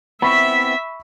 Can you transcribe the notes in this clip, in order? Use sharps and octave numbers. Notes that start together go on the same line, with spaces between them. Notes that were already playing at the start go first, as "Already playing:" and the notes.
B3 C4 E4 E5 B5 C#6 B6